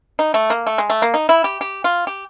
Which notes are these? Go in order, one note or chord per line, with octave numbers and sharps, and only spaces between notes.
D#4
A3
A#3
A3
G#3
A3
A#3
D#4
E4
G4
G4
F4
G4